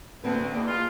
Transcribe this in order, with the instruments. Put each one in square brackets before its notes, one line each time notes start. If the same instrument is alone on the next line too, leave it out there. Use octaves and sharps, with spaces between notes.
[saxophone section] D2 [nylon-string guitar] A#3 C4 B4
[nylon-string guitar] C4
[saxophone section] E2 [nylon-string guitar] A#3 D5 D#5
[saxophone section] F4